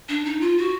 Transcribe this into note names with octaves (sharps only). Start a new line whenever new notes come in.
D4
D#4
F4
F#4